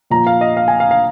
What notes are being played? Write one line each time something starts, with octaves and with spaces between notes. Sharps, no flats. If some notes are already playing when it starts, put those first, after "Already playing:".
A#2 F3 A#5
F5
D#5
F5
G#5
F5
F5